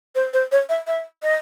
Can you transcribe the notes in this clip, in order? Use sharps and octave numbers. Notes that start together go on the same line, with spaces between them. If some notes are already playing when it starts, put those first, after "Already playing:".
C5
C5
C#5
E5
E5
D#5